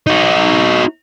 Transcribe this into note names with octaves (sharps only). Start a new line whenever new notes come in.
D#4 F#4